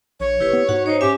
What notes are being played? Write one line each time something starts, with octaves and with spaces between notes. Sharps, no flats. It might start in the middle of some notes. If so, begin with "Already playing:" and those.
A#1 C#5
F#1 E4 G4 B4
B3
G#2 F#4 F#5
D#4 C5 C#5
C#4 G4 E5 G#5